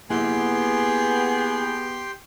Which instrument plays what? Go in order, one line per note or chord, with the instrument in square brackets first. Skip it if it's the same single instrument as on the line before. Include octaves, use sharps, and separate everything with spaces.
[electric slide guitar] A#3 E4 F#5 [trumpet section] B3 [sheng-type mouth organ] G4 G5 C6 [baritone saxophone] G#4